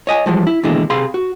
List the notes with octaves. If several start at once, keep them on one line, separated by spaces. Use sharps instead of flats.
C#5 D#5 G#5
E3 F3 G3 G#3
E4
D#2 B2 D3 E3 G#3 E4
C3 G#4 F5 B5 C6
F#4